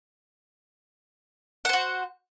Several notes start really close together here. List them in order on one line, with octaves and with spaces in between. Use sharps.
F#5 C5 F#4